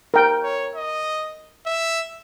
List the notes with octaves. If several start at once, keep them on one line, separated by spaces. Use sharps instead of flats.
A#4 G5
C#5
D#5
E5